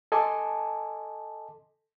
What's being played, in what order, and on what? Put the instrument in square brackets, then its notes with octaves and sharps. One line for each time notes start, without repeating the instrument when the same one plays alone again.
[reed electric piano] A4 D#5 G#5 A5 C6 D6